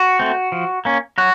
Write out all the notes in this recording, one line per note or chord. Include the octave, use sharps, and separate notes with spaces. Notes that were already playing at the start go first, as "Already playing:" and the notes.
Already playing: F#4
A3 C4
F3
A#3 C#4
F#3 F#4